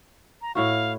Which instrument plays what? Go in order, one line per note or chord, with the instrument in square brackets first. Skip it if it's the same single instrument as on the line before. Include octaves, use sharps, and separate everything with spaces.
[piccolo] A#5
[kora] A2 E4 F#4 [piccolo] F5